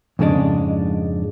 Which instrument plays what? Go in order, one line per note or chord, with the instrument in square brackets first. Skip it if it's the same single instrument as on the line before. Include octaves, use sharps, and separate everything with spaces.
[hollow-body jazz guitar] F2 G#2 C#3 G#3 D4